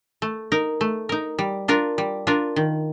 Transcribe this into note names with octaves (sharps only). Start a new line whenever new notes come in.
A3
D#4 A#4
A3
D#4 A#4
G3
D4 F4 A#4
G3
D4 F4 A#4
D#3